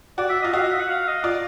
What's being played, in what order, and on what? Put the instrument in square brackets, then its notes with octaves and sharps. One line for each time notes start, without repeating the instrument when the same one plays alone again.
[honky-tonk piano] F#4 [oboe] D5
[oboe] E5
[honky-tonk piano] F4 [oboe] D#5
[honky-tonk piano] F#4 [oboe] F5
[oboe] D#5
E5
F#5
F5
D#5
[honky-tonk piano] F4 [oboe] D5